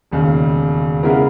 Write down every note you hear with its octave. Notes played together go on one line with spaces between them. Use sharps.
E1 D#2 C#3
C#3 G#3 B3 E4 A#4